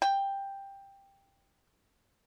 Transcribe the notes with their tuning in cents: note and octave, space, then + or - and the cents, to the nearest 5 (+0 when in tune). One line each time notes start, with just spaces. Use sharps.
G5 +10